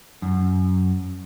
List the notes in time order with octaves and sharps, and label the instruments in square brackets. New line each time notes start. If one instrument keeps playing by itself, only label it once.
[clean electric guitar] F#2